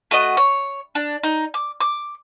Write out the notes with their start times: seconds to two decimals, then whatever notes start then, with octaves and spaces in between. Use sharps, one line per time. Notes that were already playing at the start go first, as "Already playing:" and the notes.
0.11 A3 F#4 D#5
0.37 C#5
0.95 D4
1.24 D#4
1.54 D6
1.81 D6